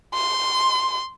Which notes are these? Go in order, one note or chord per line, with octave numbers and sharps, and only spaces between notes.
C6